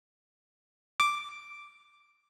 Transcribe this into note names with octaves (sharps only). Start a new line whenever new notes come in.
D6